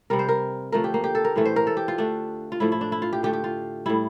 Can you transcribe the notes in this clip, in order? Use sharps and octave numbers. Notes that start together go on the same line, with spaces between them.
C3 G3 A#4
C5
A#4
D3 F3 A3 A#4
G4
A#3
G4
A4
A#4
A2 E3 A3
C5
A#4
A4
G4
F4
D3 A3 D4
F4
A2 F3 A3 E4
E4
D4
E4
F4
G4
D3 A3 G4
G4
F4
A2 G3 E4